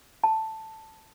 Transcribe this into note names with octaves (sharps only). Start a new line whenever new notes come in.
A5